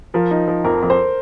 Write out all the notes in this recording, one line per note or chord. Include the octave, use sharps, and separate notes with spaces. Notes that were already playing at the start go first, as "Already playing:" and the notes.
F3 A#4
D#4
F3
F2 A#4
F2
C5